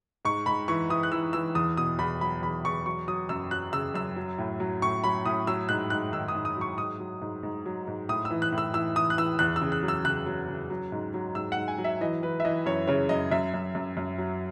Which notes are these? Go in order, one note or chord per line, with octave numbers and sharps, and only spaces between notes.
G#2 C#6
G#2 B5
E3 C#6
E3 D#6
F#6
E3 E6
E3 E6
E2 D#6
B2 D#6
E2 B5
F#3 B5
E2 B5
E2 C#6
F#3 C#6
F#3 D#6
F#2 E6
F#3 F#6
C#3 E6
F#2 E6
F#3
A2
F#3
A2 C#6
F#3 B5
A2 D#6
F#3 E6
G#2 F#6
G#2 F#6
D#3 E6
D#6
G#2
D#6
F#3 C#6
G#2 D#6
F#3
G#2
G#2
F#3
G#2
A2 D#6
E6
E3
F#6
A2
E6
E3 E6
E3 D#6
F#6
E3 E6
E2 F#6
E6
C#3
F#6
F#3
E6
C#3 F#6
F#3
C#3
F#3
G#2
F#3
G#2 E6
G#2 F#5
G#5
F#3
E5
E3 D#5
E3 B4
E5
E3 D#5
F#2 C#5
C#3 C#5
F#2 D#5
F#2 E5
F#2
F#2
F#2
F#3